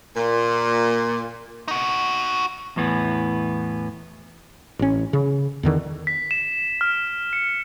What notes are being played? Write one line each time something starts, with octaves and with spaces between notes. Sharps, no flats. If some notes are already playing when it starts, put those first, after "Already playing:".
A#2
D#4 F#4
E2 A2 E3 B3
A1 C#4
C#3
E2 D3 D#3
B6
E7
F6
C#7